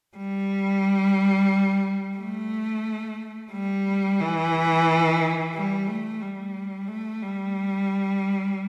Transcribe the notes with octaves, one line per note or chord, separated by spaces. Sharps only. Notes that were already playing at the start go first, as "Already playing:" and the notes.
G3
A3
G3
E3
G3
A3
G3
A3
G3